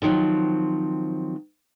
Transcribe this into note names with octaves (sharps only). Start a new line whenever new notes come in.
D3 D#3 F3 F#3 C4